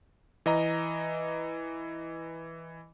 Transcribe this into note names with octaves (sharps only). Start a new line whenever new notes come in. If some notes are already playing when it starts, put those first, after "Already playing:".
E3 D#5 A#5